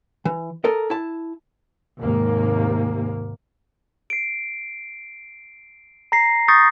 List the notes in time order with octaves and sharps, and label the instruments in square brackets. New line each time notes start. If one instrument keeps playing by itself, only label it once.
[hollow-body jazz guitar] E3
A4 A#4 D#5
E4 A5
[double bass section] D#2 G#2 C3 A#3
[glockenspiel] C7 D7
A#5 A#6 C7
C#6 D#6 G6 A6 A#6 C#7